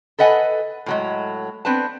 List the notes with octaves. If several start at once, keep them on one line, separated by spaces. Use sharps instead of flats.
A4 B4 D#5 F#5 G#5
A2 F#3 G#3
B3 C4 D4 B4 A5